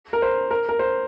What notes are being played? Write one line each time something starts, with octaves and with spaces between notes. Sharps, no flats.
A#4
C5
A#4
A#4
C5